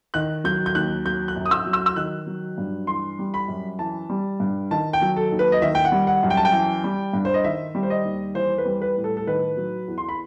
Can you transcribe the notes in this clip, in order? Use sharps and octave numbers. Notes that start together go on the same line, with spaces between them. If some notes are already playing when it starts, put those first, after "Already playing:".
D#3 F#6
F#3 G6
G6
D#2 F#6
F#3 G6
F#6
F#2
D#6
E6
F#3
E6
E6
D#3 F#6
F#3
G2
E3 C6
G3
B5
F#2
E3 A5
G3
G2
D#3 A5
G5
F#3
A4
D#2
B4
D#5
D#3 E5
G5
F#5
G3
F#5
F#2
G5
A5
G5
E3
G3
G2
C5
D#5
D#3 E5
G3
C5
D#5
D#2
E3 C5
B4
G3
B4
A2
A4
A4
D#3 B4
F#3
E2
C6
B5